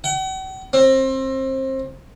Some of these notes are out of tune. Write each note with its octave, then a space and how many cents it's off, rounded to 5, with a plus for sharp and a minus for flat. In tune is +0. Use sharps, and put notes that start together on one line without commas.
F#5 +45
C4 +25